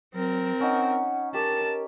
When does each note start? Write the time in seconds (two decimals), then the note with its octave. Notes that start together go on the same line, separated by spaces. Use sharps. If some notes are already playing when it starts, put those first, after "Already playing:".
0.14 F#3 C4 A#4
0.60 C#4 D#4 F#5
1.34 G4 A#4 A5